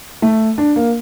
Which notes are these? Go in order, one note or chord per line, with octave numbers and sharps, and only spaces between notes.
A3
D4
A#3